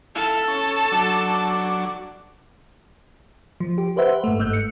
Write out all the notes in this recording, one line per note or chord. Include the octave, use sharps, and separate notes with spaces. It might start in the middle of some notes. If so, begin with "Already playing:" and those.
E4 A4 F5 A5
C#4
F#3 D4
F3
G4
G4 B4 C5 E5 F#5
G#2 A3
G1 G#2 A3 E6 F#6 G6
C#7